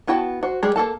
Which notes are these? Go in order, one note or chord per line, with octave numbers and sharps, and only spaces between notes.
B3 E4 F#4 G5 A5
F#4 C5
G3 G#3 G4 G#4
A#3 F#4 A4 A5